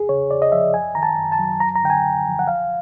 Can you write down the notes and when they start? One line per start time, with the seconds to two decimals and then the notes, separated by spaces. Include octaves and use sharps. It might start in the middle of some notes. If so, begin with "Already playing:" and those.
Already playing: E2 G#4
0.09 C#3 C#5
0.31 E2 D5
0.42 D#5
0.52 F3 E5
0.74 F#2 G#5
0.95 D#3 A#5
1.03 A5
1.17 F#2
1.32 A5
1.39 F#3
1.60 D#2 A#5
1.75 A#5
1.83 D3 G5
1.90 G#5
2.04 D#2
2.26 F3
2.39 F#5
2.48 C2 F5